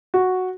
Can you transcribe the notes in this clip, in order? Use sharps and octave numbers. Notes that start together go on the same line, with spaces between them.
F#4